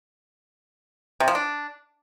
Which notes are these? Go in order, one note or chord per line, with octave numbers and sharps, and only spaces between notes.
C3
F3
D4